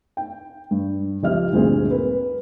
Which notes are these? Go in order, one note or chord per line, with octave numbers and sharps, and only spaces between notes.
G5
G2
C#2 F3 G4 D#5 E5 F6
D2 G2 A#2 C4 G#4
A#4 B4